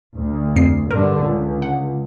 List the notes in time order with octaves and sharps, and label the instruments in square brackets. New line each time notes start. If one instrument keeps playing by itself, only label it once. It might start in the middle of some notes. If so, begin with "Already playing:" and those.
[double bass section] D2
[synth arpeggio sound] F2 C7
[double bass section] G2 D3 [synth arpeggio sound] A#4
[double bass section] C#2
[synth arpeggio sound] F#5